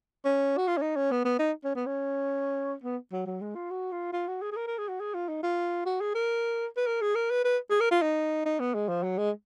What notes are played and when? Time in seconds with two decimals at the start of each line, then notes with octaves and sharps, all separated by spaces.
0.25 C#4
0.58 F#4
0.68 F4
0.78 C#4
0.82 D#4
0.96 C#4
1.11 B3
1.25 B3
1.39 D#4
1.65 C#4
1.75 B3
1.86 C#4
2.84 B3
3.13 F#3
3.27 F#3
3.42 G#3
3.55 F4
3.70 F#4
3.92 F4
4.13 F4
4.28 F#4
4.42 G#4
4.52 G#4
4.57 A#4
4.67 A#4
4.79 G#4
4.89 F#4
5.00 G#4
5.15 F4
5.29 D#4
5.43 F4
5.86 F#4
6.01 G#4
6.15 A#4
6.77 B4
6.87 A#4
7.02 G#4
7.16 A#4
7.30 B4
7.45 B4
7.70 G#4
7.81 A#4
7.92 F4
8.02 D#4
8.46 D#4
8.60 B3
8.75 G#3
8.89 F3
9.03 F#3
9.18 G#3